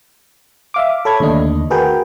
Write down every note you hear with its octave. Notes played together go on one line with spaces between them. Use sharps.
E5 F5 D6
A4 C#5 B5 G#6
D#2 D3 A3 D4 D#5
F#4 G#4 A#4 B4 G5